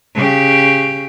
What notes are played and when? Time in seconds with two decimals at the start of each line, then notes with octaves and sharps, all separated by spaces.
0.15 C#3 G4